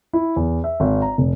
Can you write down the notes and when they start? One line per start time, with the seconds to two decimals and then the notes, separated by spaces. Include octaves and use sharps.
0.13 E4
0.36 E2
0.64 E5
0.80 G#1
1.02 A#5
1.18 F1